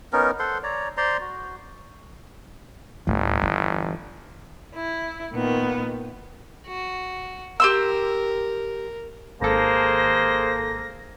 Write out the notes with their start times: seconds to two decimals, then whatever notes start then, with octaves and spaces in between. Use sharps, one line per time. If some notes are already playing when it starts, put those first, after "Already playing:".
0.13 B3 C#4 D#4 A#4
0.39 A4 C5 F#5 C6
0.63 C#5 D5 A#5
0.97 C5 D5 A#5 C6
1.20 F#4
3.07 G1 D2 A2
3.42 E3
4.75 E4
5.32 A#2 D#3 B3
6.67 F#4
7.60 G4 A#4 C6 E6
9.42 G#1 A#3 G#4 A4 C5 A#6